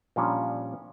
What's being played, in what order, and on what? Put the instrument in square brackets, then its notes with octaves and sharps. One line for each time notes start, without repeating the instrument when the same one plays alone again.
[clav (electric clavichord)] A#2 F3 G3 C#4 D4